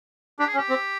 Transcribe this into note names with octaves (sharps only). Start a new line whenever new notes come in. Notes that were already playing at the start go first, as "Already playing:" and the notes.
D4 G4
G#4
C#4
G4
C4